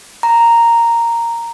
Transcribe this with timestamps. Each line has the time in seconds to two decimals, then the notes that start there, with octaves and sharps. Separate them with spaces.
0.23 A#5